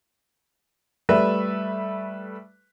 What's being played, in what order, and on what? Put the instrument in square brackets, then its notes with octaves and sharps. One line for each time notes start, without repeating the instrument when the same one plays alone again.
[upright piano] G3 A3 B4 E5